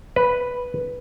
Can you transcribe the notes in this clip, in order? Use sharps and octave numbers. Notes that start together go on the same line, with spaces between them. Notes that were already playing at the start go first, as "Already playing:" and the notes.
B4